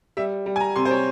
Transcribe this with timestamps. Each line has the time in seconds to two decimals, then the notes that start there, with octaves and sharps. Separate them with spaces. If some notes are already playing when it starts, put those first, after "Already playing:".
0.17 G3 E5
0.46 G3
0.56 G#5
0.61 A#5
0.76 C3 C6
0.85 C5
0.91 C#5